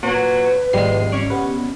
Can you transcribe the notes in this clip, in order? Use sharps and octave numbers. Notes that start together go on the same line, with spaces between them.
A#2 F#3 B4
G#1 F2 A2 G3 G#3 C7
C#2 C#4 C#5 D5
B3 G4 B4